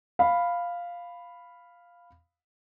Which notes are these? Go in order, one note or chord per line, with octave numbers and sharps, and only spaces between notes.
F5 B5